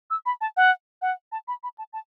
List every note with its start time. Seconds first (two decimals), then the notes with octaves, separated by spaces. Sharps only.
0.11 E6
0.26 B5
0.41 A5
0.57 F#5
1.02 F#5
1.32 A5
1.48 B5
1.63 B5
1.78 A5
1.93 A5